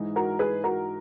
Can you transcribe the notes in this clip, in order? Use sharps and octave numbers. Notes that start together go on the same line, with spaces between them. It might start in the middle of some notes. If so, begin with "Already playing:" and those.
Already playing: G#2 E3 G#3 D#4
F#4 A#4
G#4 B4
F#4 A#4